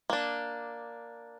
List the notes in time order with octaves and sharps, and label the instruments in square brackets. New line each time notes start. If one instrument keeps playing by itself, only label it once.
[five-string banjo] A#3 D4